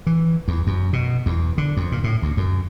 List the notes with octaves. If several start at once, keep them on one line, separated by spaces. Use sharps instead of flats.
E3
E2
F#2
B2
E2
D3
F2
A#2
A2
D2
F#2